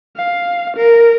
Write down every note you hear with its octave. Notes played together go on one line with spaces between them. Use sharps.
F5
A#4